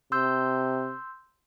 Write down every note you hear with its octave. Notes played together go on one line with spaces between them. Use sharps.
C3 C6 E6 G6